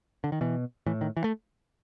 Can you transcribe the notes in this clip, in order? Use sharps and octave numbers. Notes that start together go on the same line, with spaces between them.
D3
D#3
B2 E3
A2 E3
D#3
E3
A3